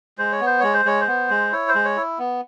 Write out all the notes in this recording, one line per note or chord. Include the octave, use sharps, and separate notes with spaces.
G#3 C5
C#5
B3
C5
G#3 C#5
C5
G#3 C#5
C5
B3
G#3
E4 C#5
C5
G#3
C#5
E4
B3